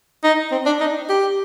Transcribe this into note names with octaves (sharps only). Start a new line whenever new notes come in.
D#4
C4
D4
D#4
G4